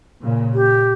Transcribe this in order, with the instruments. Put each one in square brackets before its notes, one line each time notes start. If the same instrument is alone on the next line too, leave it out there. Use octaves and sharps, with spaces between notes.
[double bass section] A#2 C#3
[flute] G4